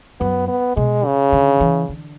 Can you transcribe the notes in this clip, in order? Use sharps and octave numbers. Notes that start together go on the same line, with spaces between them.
F#2 B3
B3
B2 G#3
C#3
D3
E3
D3